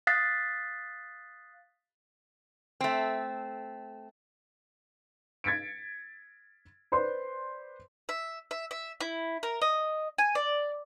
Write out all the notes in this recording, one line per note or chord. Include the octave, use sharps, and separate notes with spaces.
F5 D#6 F#6 A6 B6 C7
A3 C4
G#6 A6 B6 C#7 D7
B4 C5 D5 C6
E5
E5
E5
E4
A#4
D#5
G#5
D5